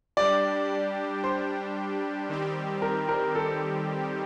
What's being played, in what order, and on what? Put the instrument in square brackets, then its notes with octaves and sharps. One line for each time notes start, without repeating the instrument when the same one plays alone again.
[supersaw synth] G3 D4 G4 [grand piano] D5
[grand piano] C5
[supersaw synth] D#3 G3 C4 G4
[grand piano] A#4
A#4
A4